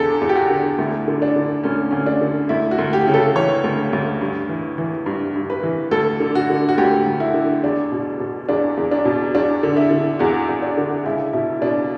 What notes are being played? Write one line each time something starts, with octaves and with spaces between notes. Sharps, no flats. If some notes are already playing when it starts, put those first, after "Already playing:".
Already playing: E2 D3 A4
E2
G4
F#4
D3
D2 E4
D3
D4
D3
D2 C#4
D2 C#4
D4
D3
D2 E4
F#4
D2
G4
C#3
A4
E3 C#5
D2
D2
G2
E3
E3
G2
G2
B4
E3
D2 A4
D3
F#4
D3
F#4
D2 G4
D2
E4
D3
E2 D4
B2
B2
E2 D4
E2
D4
B2
E2 D4
D3
E4
D3
E2 F#4
E2
D4
D3
C#2 E4
B2 E4
B2 D4